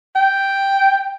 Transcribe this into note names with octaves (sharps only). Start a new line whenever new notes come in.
G5